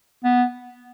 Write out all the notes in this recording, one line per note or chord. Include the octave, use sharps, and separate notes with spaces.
B3